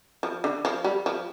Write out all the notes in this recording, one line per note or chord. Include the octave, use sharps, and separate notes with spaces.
F3
D3
F3
G3
F3